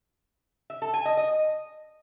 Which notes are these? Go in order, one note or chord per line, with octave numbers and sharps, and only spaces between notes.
E5
A4
G#5
D#5
D#5